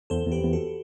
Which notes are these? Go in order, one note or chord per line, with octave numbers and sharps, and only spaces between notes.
E2 A4 C5
E2
G4 B4
E2
F#4 A4